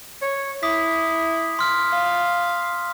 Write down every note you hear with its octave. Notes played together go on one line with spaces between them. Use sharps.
C#5
E4 D6 D#6 B6
C6 F6 B6
F5